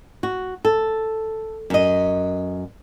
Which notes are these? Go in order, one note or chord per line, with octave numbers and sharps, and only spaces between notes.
F#4
A4
F#2 D#5